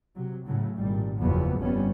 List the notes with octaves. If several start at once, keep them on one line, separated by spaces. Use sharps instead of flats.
C3 F#3
A2 C#3 F#3
G#1 A#2 G3
F#1 E2 F3 B3
G1 F2 G3 B3 C#4